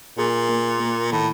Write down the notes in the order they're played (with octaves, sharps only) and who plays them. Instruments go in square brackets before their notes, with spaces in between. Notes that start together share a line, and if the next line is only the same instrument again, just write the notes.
[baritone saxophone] A#2 [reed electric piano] G#4
[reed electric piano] A#3
A#3
[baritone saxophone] A2 [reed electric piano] D#3